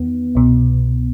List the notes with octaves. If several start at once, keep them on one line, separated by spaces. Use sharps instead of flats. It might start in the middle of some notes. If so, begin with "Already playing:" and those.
Already playing: E2 D#3 B3
C2 B2